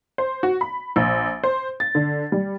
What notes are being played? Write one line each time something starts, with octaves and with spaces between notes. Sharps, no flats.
C5
F#4
B5
A#1
C5
A6
D3
G3